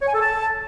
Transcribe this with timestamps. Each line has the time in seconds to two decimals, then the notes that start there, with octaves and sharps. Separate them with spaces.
0.01 C#5
0.08 G#5
0.14 A4
0.21 A5